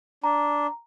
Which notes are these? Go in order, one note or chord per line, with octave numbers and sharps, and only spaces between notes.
D4 A#5